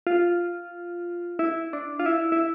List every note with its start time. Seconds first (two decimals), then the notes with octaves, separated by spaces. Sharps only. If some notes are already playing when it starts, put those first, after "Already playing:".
0.07 F4
1.39 E4
1.73 D4
1.99 F4
2.06 E4
2.32 E4